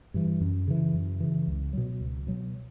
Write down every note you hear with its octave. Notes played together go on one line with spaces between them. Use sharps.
G2 E3
F#2
C#3 E3
F#2
C#3 E3
C#2
B2 F#3
C#2
B2 F#3